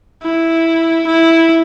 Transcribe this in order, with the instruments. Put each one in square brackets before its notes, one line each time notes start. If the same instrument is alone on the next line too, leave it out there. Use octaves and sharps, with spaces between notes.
[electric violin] E4
E4